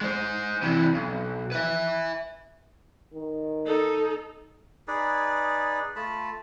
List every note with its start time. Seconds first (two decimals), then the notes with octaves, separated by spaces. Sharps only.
0.01 G#3 C5
0.62 C3 E3
0.94 B1
1.52 B4 E5
3.13 D#3
3.66 D#4 A4
4.88 D#4 G#4 B4 D5
5.96 A3 F4 A5 B5